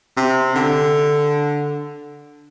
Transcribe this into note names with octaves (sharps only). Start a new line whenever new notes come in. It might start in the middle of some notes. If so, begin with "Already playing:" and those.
C3
D3